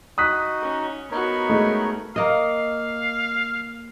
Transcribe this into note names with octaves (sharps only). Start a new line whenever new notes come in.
D#4 F#4 D#6 F#6 B6
C#4
B3 D#4 F#4 A#4 C#5
G#3 A3 D#5
A#3 D#5 F5